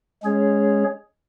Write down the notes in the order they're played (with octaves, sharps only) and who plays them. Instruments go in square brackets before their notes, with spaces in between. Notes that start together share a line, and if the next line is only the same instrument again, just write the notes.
[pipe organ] G#3 C#4 G#4 C#5